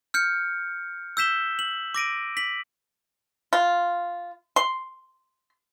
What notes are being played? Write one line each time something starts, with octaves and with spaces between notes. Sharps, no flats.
F6 G6 C#7
E6 G6 B6 E7 G7
F#7
D6 A#6 D7 D#7
B6 F#7
F4
C6